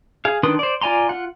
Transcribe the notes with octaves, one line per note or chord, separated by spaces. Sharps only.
G#4 F5
D#3 D4 B4 C6 D#6
C5 D5
F4 D5 G#5 A#5 C6
F4 F#5